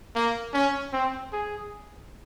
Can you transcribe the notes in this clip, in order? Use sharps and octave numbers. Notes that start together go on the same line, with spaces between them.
A#3
C#4
C4
G#4